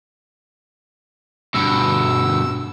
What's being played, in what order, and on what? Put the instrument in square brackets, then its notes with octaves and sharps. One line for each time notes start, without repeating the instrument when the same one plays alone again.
[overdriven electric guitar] G2 B2 [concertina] E6